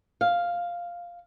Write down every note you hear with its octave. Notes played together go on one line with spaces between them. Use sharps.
F5